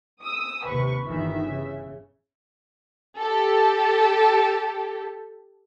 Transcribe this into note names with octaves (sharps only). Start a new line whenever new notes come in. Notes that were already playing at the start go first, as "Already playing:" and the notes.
D#6 E6
D#2 C3 B4 C#6
G1 D#3 E3 E5
C#3
G4 A4